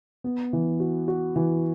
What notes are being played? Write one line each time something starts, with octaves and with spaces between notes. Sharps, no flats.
B3
E3
F#4
F#4
E3